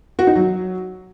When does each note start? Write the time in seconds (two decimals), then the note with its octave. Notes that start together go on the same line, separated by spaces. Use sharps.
0.19 F#4
0.27 D#4
0.36 F#3